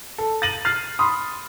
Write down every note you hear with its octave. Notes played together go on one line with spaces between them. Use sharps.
A4
A6 A#6 D#7 F#7
F6 A6 C7
B5 C6 D#6